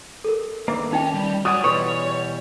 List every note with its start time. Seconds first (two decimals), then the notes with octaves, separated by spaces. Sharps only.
0.24 A4 A#4
0.68 D3 D#3 A#3 B4 E5 D6
0.93 D#3 C#4 D#4 E5 G5
1.14 G3
1.45 F#4 C#5 D5 F#5 G#5 D#6
1.64 B2 E3 G3 B4 C#5 C6 C#6